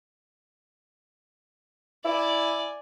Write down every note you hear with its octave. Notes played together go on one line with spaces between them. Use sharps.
E4 D5 G#5